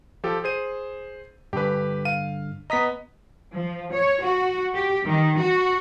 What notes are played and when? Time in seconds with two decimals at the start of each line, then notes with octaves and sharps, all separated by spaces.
0.24 F3 G4 A4
0.44 G#4 C5 D#7
1.53 G2 D3 G4 B4
2.05 F5 D#7
2.70 B3 D#5 A#5 D#6 B6
3.54 F3
3.93 C#5
4.23 F#4
4.74 G4
5.05 D#3
5.38 F#4